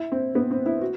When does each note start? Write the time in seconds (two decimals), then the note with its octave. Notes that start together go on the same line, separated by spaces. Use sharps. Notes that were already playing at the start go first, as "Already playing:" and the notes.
Already playing: E4
0.12 C4
0.35 B3
0.51 C4
0.66 E4
0.81 F#4